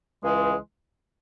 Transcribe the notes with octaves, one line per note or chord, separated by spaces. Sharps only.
C#2 C#3 E3 G#3